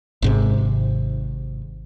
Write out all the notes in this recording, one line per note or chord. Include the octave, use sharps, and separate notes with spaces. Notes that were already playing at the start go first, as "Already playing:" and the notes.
G#1 G#2 C3